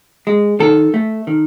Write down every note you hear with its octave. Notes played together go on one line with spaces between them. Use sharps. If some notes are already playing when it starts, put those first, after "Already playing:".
G#3
D#3 A4
A3
D#3